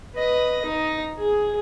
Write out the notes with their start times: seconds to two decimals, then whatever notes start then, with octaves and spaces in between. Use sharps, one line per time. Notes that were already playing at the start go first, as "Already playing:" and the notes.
0.15 B4 D#5
0.65 D#4
1.19 G#4